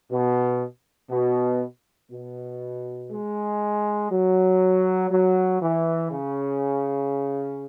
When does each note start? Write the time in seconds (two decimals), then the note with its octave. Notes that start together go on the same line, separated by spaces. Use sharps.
0.10 B2
1.10 B2
2.11 B2
3.10 G#3
4.11 F#3
5.10 F#3
5.61 E3
6.11 C#3